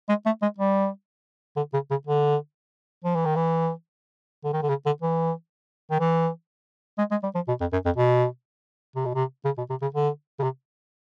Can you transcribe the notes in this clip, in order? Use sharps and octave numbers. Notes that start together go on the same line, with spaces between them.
G#3
A3
G#3
G3
D3
C#3
C#3
D3
F3
E3
D#3
E3
D3
D#3
D3
C#3
D3
E3
D#3
E3
G#3
G#3
G3
F3
B2
F2
F#2
F2
B2
C3
B2
C3
C#3
B2
C3
C#3
D3
C#3
C3